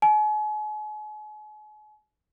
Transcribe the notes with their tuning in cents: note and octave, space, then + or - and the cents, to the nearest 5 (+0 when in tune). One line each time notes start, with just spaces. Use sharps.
G#5 +40